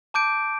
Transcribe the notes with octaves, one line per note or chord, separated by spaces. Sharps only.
A5 D6 G6 D7